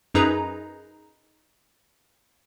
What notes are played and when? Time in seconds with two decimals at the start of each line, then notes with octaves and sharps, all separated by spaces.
0.14 F#2 D#4 G#4 B4 A#5